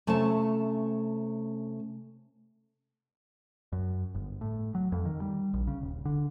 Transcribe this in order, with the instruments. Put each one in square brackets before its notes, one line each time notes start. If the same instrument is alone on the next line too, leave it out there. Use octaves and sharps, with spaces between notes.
[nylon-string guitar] C3 A3 C#4 F4 A5
[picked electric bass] F#2
G1
A2
F#3
F2
D#3
G3
A#1
C#3
D#1
D3